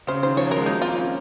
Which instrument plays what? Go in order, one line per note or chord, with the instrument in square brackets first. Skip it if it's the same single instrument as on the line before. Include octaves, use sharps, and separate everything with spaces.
[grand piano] C#3 [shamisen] C5
[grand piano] D#3 [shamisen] C5
[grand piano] F3 [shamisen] C#5
[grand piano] F#3
[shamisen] A#4
[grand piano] G#3
[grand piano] A#3 [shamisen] D#4
[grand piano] C4 [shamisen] F4
[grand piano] C#4